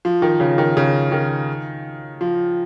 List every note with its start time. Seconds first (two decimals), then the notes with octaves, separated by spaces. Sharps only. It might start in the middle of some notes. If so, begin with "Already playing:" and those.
0.05 F3
0.22 D#3
0.40 C#3
0.58 D#3
0.77 C#3
1.12 D#3
2.21 F3